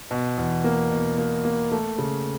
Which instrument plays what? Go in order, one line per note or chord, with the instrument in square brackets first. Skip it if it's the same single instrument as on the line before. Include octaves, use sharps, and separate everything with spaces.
[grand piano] B2
E2
A#3
B2
A#3
A#3
A3
C#3